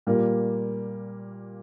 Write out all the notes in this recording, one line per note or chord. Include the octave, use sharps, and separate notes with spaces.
A#2 G3 A#3